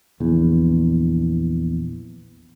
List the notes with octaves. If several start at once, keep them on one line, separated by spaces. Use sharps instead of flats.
A#1 E2